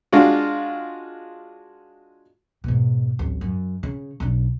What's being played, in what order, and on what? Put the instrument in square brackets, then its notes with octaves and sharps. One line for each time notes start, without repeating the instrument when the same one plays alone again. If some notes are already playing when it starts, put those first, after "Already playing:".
[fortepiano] G#3 D4 F4 F#4
[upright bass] G#2 B2
D1 A1
F#2
C#3
B1 D4